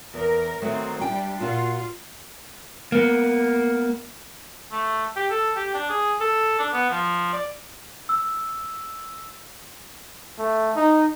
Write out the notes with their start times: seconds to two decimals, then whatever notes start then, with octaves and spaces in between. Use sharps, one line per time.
0.14 E2 A#4
0.62 D#3 F#3 A3 C4
1.01 G3 D4 G5
1.40 A#2 F4 F#4
2.92 A#3 B3
4.72 A3
5.16 G4
5.30 A4
5.56 G4
5.74 D4
5.90 G#4
6.21 A4
6.59 D4
6.73 B3
6.90 F3
7.33 D5
8.09 E6
10.38 A3
10.76 D#4